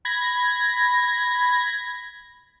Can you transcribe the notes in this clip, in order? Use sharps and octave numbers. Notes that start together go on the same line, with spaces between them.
B5 G#6 A#6